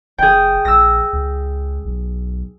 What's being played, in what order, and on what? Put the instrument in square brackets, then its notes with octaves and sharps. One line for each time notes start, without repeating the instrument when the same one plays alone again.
[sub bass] F#1 [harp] G#4 G5
[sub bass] A#1 [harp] E6 A#6
[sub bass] C#2
B1